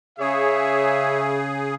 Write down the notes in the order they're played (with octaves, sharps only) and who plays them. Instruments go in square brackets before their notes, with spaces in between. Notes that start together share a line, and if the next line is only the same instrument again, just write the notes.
[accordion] C#3 G#4 [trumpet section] C#5 E5